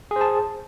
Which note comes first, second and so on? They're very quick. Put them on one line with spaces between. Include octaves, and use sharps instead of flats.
G#4 C5 A5